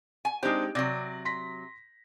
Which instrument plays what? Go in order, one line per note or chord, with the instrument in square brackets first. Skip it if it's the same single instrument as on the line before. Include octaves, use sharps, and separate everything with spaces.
[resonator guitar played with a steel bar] G#5
[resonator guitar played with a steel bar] G#3 G4 [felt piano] C4 D4 D#4
[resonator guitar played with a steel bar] C3 F#3 [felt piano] D5 A#6
[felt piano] C6 A#6 B6